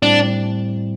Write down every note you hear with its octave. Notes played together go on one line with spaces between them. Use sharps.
A2 G3 C4 D4 E4